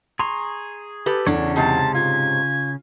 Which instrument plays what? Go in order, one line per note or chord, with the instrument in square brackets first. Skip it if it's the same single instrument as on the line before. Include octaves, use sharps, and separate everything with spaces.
[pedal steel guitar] G#4 A#5 C#6 [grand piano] C6
[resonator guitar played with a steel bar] G4 A4 B4
[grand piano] E2 [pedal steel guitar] C#3 C#4 C#5 [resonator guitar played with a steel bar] D4
[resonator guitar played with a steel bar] G#2 C3 [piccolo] A5
[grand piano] F4 [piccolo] G#6